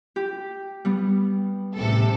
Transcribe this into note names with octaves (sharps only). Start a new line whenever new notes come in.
G4
G3 B3
A1 C3 A4